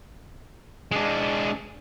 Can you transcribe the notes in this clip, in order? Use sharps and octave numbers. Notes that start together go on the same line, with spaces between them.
G#3 D4